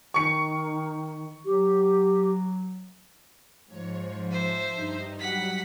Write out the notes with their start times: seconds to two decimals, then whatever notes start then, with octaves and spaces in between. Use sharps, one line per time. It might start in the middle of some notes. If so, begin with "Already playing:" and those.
0.14 D#3 C#6 C#7
1.45 F#3 G4
3.69 G#2 F3 C#5
4.31 C5 E5 A5 A6
4.75 G2 D#4
5.19 F#3 G3 F#5 B6